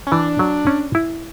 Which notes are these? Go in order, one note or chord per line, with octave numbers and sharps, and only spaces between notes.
C#4
E3 D4
F#3
C#4
E4